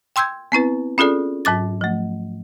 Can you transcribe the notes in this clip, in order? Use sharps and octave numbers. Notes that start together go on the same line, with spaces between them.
G5 C6 E6 G6 G#6
B3 C4 E4 B4
C#4 F4 G#4 A4 D5
G#2 F#3 D6 A6
F3 A3